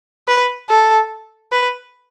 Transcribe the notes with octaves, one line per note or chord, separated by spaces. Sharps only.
B4
A4
B4